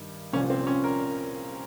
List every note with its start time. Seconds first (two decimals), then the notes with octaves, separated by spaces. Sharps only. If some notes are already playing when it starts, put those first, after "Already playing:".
Already playing: G2 D#3
0.33 C2 A#2 F3 C#4
0.50 C4
0.67 C#4
0.84 A#4